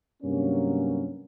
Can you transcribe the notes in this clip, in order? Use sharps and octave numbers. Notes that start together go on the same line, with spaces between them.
G2 C3 F#3 A#3 C#4